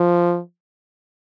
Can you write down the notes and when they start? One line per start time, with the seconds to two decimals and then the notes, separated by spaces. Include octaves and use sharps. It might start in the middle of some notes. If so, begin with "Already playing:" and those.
Already playing: F3